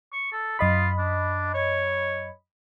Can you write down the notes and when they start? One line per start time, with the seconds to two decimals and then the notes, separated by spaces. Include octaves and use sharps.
0.12 C#6
0.32 A4
0.59 F#2 F4 D#5 B5
0.98 D4
1.54 C#5